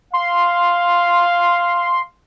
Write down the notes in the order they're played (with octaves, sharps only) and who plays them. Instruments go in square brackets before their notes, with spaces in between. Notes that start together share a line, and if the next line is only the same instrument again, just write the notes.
[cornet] F5 [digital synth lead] C6